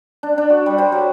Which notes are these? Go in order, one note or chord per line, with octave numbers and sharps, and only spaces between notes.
D4
D4
F#4
G3
C5
F#3